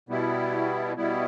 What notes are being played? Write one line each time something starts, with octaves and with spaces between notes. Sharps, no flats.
B2 G3 B3 E4
B2 G3 B3 E4